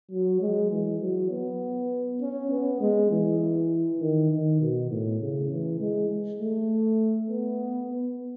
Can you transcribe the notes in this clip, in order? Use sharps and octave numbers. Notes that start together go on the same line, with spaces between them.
F#3
G#3
E3
F#3
B3
C#4
B3
G#3
E3
D#3
D#3
B2
A2
C#3
E3
G#3
A3
B3
B3